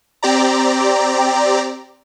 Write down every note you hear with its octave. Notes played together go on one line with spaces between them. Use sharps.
C4 G4 D5 A#5